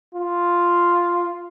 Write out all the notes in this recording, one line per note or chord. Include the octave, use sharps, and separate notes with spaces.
F4